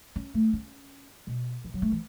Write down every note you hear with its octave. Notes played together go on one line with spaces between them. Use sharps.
C#4
A3
C#4
B2
E3
F#3
A3
E3